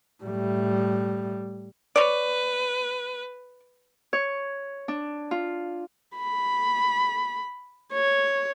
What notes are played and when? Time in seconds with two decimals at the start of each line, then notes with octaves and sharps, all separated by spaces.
0.24 A2 G3
1.96 B4 C#5 D5
4.13 C#5
4.88 D4
5.31 F4
6.18 B5
7.93 C#5